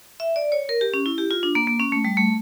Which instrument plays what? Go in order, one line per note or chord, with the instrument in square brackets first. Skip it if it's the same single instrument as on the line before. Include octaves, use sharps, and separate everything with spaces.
[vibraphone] E5
D5
C#5
A#4
G4
C#4
E4
G4
F4
D4
A#3
A#3
C#4
A3
G3
A3